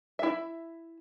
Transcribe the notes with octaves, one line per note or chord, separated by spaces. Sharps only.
E4 E5